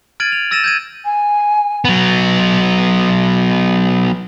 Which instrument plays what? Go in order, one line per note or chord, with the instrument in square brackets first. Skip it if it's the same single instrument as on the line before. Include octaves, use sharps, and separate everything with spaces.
[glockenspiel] F6 G#6 A6 D7 D#7 F#7
F7
E6 A6 A#6 D#7 E7
G6 G#6 D#7
[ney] G#5
[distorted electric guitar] F#3 B3